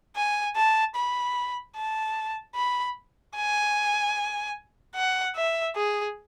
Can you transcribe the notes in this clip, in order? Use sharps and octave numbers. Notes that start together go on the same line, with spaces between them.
G#5
A5
B5
A5
B5
G#5
F#5
E5
G#4